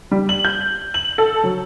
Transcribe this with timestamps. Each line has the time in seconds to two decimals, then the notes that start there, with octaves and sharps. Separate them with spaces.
0.11 G3
0.29 F#7
0.45 G6
0.94 F#7
1.18 A4
1.44 F#3